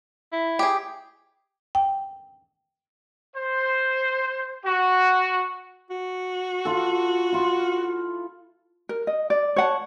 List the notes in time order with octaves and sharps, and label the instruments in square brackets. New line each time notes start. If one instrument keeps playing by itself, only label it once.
[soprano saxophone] E4
[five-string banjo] G4 G#4
[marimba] G5
[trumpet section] C5
F#4
[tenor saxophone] F#4
[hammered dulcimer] F4 A4
E4 F4
[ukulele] A#4
D#5
D5
C#5 F#5 A5